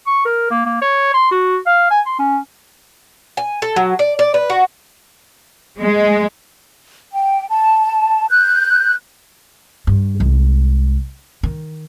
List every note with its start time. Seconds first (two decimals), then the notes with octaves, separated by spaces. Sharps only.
0.07 C#6
0.26 A#4
0.51 A#3
0.66 A#3
0.82 C#5
1.14 C6
1.31 F#4
1.66 F5
1.91 G#5
2.06 C6
2.19 C#4
3.37 G#5
3.62 A4
3.76 F#3
3.99 D5
4.19 D5
4.34 B4
4.50 F#4
5.81 G#3
7.12 G5
7.49 A5
8.30 F#6 G6
9.87 G2
10.20 C2 G#3
11.43 D#3